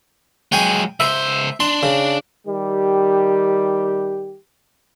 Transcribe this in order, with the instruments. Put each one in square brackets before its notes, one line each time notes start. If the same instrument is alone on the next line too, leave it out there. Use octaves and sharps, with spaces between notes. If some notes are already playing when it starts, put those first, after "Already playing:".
[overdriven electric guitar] F#3 G#3 [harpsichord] G5 G#5
[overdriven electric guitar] C#2 C5 [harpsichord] E5
[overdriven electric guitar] D4 [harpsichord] C6
[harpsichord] C#3
[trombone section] D#3 G3 G4